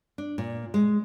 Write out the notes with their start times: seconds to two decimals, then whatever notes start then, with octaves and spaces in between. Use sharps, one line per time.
0.18 D4
0.38 A#2
0.74 G#3